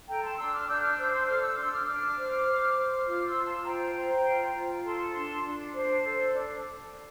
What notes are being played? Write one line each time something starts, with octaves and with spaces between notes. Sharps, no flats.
A4 G5 A#5
A5 C6
D4 C6 E6
D6 F6
D4 E6 G6
D6 F6
C5 E6 G6
C6 E6
A4 D6 F6
E6 G6
D4 C6 E6
D6 F6
D4 D6 F6
C5
C5
C5
F4 D6 F6
C6 E6
F4
A5 C6
C5 G5 A#5
C5
F4
F4
A4 A5 C6
D4 A5 C6
D4
C5
A4
D4